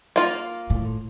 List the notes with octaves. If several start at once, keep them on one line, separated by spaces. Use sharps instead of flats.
A#3 F4
A2